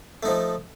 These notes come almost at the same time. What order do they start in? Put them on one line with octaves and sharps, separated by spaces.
A3 D#4 F3